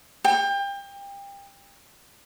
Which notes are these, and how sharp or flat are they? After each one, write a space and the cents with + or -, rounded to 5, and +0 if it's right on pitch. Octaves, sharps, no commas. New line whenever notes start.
G5 +30